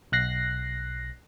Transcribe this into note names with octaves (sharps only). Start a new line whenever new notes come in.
B1 F#6 A#6 C7